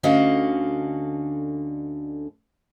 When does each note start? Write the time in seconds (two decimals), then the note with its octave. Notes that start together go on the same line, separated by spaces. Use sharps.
0.03 D2 D3 C#4 F#4 D#5 F5